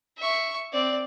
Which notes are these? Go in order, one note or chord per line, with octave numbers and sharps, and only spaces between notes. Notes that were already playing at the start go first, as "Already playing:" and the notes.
E5 C#6
C4 D5